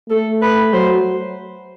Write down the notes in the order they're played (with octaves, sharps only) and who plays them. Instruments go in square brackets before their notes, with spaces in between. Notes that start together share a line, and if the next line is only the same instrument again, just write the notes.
[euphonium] A3 [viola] A4
[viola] B4
[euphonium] F#3 [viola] C5